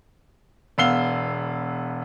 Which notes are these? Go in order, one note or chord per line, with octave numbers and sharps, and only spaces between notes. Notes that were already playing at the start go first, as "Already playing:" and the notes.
E1 B3 F5 E6 C7 G7